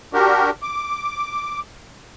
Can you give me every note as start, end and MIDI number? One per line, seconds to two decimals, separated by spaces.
0.13 0.50 62
0.13 0.50 66
0.13 0.50 67
0.13 0.50 70
0.62 1.60 86